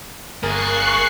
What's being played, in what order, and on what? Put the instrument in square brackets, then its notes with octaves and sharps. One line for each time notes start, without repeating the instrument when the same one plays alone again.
[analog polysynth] G1 A#4 A6 [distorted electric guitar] A#3 G#4 [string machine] C#6 F#6 C7